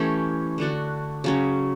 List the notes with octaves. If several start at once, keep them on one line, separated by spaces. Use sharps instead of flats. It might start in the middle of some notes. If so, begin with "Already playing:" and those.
Already playing: E3 A3 C#4 G4
D3 A3 D4 F#4
C#3 F#3 C#4